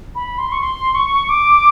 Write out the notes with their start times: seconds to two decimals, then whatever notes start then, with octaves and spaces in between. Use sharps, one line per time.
0.15 B5
0.38 C6
0.52 C#6
0.61 C6
0.95 C#6
1.29 D6